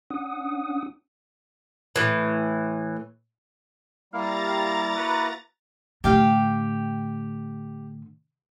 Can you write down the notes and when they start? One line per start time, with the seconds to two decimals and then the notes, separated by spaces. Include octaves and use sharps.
0.10 C#4 D4 F#5 D#6
1.96 A2 E3
4.13 G3 A#3 E4 F5 A#5 A6
4.47 F5
4.96 F#4 B4
6.04 A2 D3 G4 F5 G5